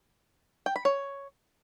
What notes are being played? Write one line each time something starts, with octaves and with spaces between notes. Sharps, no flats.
G5
B5
C#5